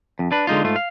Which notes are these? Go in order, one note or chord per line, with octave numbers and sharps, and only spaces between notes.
F2
D4 B4
D3 G#3 D#4 F4
G#2 A3 F4
F5